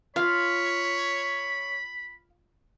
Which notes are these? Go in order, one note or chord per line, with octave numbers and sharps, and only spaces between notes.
F4 C#5 F5 B5